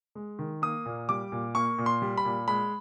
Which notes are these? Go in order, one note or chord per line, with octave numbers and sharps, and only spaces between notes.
G#3
D#3
A#3 D#6
A#2
G3 D6
A#2
A#3 C#6
A#2
C6
G3
B5
A#2
G#3 B5